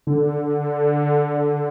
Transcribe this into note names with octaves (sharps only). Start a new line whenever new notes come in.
D3